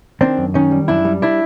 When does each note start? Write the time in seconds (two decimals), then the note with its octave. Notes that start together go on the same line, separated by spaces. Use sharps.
0.21 D#3 C4 D4
0.38 F#2
0.54 D#3 C#4 D#4
0.71 G3
0.88 F#2 D4 E4
1.05 G3
1.22 D4 E4